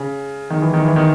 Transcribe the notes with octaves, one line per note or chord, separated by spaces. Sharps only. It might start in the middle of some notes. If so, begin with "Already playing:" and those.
Already playing: C#3
D#3
E3
D#3
E3
D#3